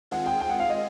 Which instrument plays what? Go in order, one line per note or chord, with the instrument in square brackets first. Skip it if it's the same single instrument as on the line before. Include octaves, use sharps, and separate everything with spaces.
[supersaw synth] D#3 G#3 C4 F4 G#4 [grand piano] F#5
[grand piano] G5
G5
F#5
F5
D#5